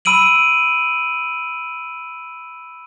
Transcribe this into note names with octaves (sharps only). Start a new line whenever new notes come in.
B5 E6 D7 D#7 F#7